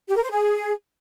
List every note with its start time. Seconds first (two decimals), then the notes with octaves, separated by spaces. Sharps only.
0.08 G4
0.15 A#4
0.23 C5
0.30 G#4